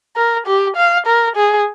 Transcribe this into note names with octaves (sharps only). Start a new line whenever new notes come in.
A#4
G4
F5
A#4
G#4